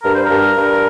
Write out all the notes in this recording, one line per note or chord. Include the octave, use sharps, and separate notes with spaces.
G2 A#4
C5
G2 A#4
G2